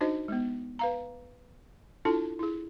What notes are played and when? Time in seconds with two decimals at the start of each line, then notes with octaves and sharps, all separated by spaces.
0.01 D4 D#4 F#4 C5 D#5
0.28 G#3 B3
0.79 B4 F5 A#5
2.05 D4 E4 F4 A4 A5
2.39 E4 G#4